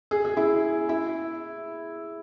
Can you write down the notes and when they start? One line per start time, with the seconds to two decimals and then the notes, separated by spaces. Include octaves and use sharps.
0.11 G#4
0.25 G#4
0.37 E4
0.89 E4